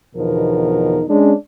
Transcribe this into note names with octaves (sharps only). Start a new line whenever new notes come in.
E2 B2 D3 F3 D#4 A#4
G#3 C#4 D4